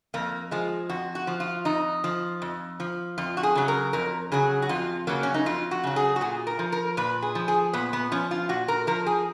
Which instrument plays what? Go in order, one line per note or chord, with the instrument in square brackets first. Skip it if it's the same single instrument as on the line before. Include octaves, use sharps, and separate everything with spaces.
[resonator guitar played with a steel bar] F2 A#3
F3 G#3
F2 F#4
F#4
F3
F4
F2 D#4
F3
F2
F3
F2 F4
F#4
G#4
C#3 F#3
A#4
F2 A#4
C#3 F#3 G#4
F#4
F2 F4
C#3 F#3 A#3
C#4
D#4
F2 F4
F#4
C#3 F#3
G#4
F#4
A#2 G#4
A#4
F3
A#4
A#2 B4
G#4
F3
G#4
A#2 B3
B3
F3 C#4
F4
A#2 F#4
A#4
F3 A#4
G#4